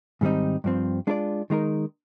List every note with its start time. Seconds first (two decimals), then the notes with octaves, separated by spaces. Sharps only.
0.21 G#2 D#3 G3 C4 D#4
0.64 G2 F3 C4
1.07 G#3 D4 F4 A#4 D5
1.50 D#3 G#3 D#4 A#4